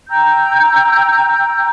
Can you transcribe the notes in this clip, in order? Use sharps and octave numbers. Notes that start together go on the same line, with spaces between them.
G5 A#5 E6 G6